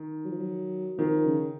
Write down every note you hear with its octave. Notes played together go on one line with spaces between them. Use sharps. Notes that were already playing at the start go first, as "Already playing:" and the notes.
Already playing: D#3
F#3
F3
F#3
D#3 F3
C#3